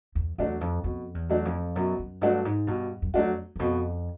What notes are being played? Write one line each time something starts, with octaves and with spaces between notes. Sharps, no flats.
E2
E2 F#3 A3 D4 F#4
F2
F2 B2
E2
F#3 A3 D4 F#4
F2
F#2 B2
F#2
G2 F#3 A3 D4 F#4
G#2
G2 B2
F#2
F2 F#3 A3 D4 F#4
E2
F2 B2